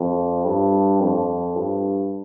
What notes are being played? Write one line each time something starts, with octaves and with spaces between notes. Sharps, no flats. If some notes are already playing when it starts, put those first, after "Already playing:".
Already playing: F2
G2
F2
G2